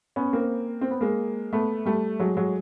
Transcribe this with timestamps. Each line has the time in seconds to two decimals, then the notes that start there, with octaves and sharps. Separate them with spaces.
0.16 B3 C#4
0.33 A#3 C4
0.81 C4
0.91 B3
1.01 G#3 A#3
1.53 A3 B3
1.86 G3 A3
2.20 F#3 G#3
2.37 F#3 G#3